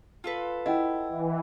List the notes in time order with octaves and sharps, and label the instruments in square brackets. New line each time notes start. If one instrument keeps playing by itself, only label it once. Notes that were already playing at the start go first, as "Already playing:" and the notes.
[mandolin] F4 A4 B4
[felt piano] E4 [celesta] D#5 F#5 G5
[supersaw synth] E3